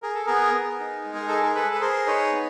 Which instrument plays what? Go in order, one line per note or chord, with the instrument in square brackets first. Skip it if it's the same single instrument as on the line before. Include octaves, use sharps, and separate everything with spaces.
[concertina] G#4 A#4
A4
B3 G#4 A#4
B3
D#4
G#3
G#4
G#4 A4
A#4
G#4 A4 B4
B4
G#4 A#4 C5
D#4 B4 C#5
B3